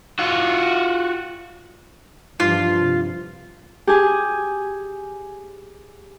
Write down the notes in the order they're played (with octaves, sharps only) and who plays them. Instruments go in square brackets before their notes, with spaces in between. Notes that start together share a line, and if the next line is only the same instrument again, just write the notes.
[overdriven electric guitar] F4 F#4
[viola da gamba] G2 E3 F3 [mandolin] F4
[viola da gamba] C3
[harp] G4 G#4 G#5